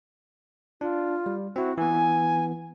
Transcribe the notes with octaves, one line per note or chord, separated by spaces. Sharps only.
D4 F4
G3
C4 E4 F#4
E3 B3 G#5